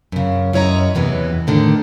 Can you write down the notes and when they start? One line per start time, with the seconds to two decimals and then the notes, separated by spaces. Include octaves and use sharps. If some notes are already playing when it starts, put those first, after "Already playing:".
0.12 F#2 C#3
0.53 F#2 E4 C#5 D#5 A#5
0.95 E2 C3 E3 B3
1.47 A2 D3 D#3